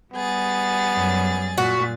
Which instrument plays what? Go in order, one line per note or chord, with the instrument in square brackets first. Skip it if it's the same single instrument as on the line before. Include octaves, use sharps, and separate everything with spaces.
[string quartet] G3 G#4 A6 [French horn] B3
[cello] F#2
[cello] A#2 [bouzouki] F#4